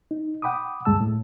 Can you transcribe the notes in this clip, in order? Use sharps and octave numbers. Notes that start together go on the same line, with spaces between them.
D#4
F#5 G5 B5 D6 D#6
D2 G2 G#3 A5 E6
A2